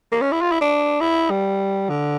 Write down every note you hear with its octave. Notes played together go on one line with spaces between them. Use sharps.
A#3
C#4
E4
F4
E4
D4
E4
G3
D3